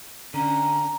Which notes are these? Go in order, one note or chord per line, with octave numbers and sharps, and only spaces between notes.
D3 C#4 A#5